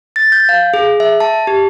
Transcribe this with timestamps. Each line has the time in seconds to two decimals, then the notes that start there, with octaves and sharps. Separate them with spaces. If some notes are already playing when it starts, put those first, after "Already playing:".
0.16 A6
0.32 G6
0.49 F5
0.74 G#4
1.00 E5
1.20 A5
1.47 G4